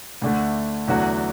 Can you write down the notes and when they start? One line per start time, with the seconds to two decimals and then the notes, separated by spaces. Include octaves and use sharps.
0.22 D2 D3 A3
0.88 E2 D3 F#3 A3 F#4